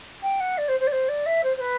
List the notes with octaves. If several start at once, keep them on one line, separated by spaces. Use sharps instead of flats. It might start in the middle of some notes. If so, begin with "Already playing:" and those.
G5
F#5
D5
C5
C5
D5
C5
D5
E5
C5
C5
B4